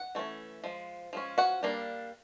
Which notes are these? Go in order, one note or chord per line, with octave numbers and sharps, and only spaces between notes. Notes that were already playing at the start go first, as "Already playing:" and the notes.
Already playing: F#5
E3 A3 C#4
F3 G#3
F3 G#3 C#4
F#4 F#5
G3 A#3 D4